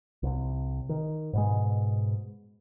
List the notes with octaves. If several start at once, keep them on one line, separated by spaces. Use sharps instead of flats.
C2 C3
D#3
G#2 B2 G#3